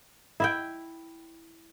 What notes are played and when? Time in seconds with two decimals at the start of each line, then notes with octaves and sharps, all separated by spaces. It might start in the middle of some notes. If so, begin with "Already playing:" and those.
0.40 E4 E5 G5